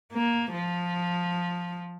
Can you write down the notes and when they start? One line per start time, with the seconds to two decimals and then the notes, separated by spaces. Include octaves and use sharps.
0.13 A#3
0.52 F3